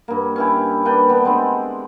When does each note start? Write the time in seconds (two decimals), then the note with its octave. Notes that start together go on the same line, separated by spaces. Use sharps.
0.08 G2 A#3
0.36 C#4 E4 G4
0.85 A#3 D4 B4 G5
1.09 G3 B3 D4
1.25 G#3 C4 D4